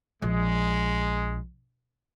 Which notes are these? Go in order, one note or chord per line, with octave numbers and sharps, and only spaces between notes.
A#1 G#3